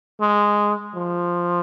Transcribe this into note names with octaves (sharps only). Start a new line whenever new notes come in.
G#3
F3